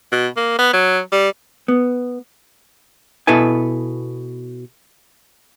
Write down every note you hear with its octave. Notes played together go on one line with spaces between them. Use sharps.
B2
A#3
B3
F#3
G3
B3
B2 E4 A4 B4 G#5